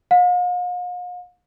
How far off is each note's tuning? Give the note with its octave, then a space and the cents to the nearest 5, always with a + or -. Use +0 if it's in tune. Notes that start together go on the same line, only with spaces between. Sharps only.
F5 +45